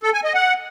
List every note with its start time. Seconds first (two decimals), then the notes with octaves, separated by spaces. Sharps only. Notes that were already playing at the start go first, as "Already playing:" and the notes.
0.03 A4
0.14 G#5
0.24 D#5
0.35 F#5